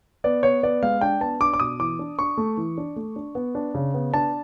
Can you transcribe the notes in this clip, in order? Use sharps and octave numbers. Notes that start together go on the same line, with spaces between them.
B3 D5
B3 C#5
B3 D5
G#3 F5
D4 G5
B3 A5
D4 D6
D6
B2 D#6
E3 D6
D4
D4 C#6
A3
E3
D4
A3
D4
B3
D4
C#3
B3
D4 A5